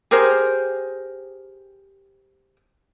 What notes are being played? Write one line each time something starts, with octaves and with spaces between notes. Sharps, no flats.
G4 G#4 A#4 C5